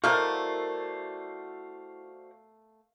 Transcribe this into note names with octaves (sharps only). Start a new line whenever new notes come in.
B2 A3 E4 F#4 A#4 C5 D5 F5